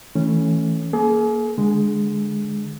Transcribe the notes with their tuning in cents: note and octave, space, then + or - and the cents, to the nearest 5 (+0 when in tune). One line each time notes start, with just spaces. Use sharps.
E3 -20 A3 +5 C#4 +0
A#3 +0 G#4 +40
D3 +10 G#3 +0